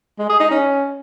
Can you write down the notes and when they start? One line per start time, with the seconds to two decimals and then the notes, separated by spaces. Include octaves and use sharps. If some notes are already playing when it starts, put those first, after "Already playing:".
0.19 G#3
0.29 G#4
0.40 D#4
0.51 C#4